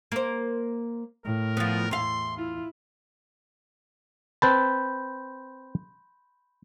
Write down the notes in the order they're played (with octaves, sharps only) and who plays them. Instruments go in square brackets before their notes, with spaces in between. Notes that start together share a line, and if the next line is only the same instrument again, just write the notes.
[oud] A#3 C5
[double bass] A2 [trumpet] A#4
[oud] F3 B3
[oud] E2 F5 [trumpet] C6
[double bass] E4 [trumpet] F4
[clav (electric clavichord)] C4 B4 A5 [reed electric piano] B5 C6 G6